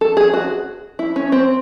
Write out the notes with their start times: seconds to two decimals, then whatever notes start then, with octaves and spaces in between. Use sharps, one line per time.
0.01 A4
0.17 G#4
0.34 F#4
0.99 E4
1.16 C#4
1.32 C4